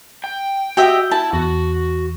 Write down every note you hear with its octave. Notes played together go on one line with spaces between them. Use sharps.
G5
F#4 G4 D#5 E5 G6
E4 A5
E2 F#4